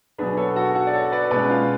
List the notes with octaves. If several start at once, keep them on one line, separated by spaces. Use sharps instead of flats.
B2 F#3 B3 D4 G#4 B4
A4 C#5
F#4 A4
F#4 A4
D5
A4 C#5
B4 D5
B2 G#3 C#4 B4 D5
F4